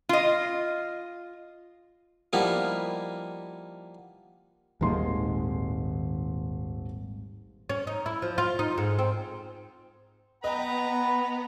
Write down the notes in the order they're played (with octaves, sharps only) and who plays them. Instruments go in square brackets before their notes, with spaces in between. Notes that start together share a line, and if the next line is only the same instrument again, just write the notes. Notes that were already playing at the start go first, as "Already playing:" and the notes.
[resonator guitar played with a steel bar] F4 D#5
[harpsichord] F3 G3 A#3 B3 D#4 E4
[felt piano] D#1 C6 [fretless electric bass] G#1 D#3 G#3
[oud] C#4
D#4
E4
F3
F4
D#4
G#2
C4
[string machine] B3 [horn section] B4 A#5 [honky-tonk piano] D#5 G5 [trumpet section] F#5 B5